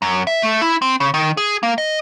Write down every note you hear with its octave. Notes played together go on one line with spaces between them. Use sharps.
F#2
E5
A3
E4
C4
C#3
D#3
G#4
A#3
D#5